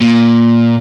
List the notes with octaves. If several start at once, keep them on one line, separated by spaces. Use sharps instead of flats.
A#2